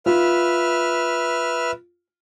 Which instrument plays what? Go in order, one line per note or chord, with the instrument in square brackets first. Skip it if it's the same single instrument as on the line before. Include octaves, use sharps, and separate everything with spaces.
[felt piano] F4 [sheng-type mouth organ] B4 E5 F6